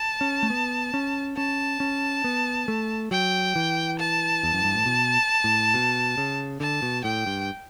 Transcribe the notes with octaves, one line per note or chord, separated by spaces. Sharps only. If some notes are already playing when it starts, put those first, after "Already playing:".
Already playing: A5
C#4
A3
B3
C#4
C#4 A5
C#4
B3
A3
F#3 G5
E3
A5
E2
F#2
G2
A2
B2
A2
B2
C#3
D3 A5
B2
A2 G5
G2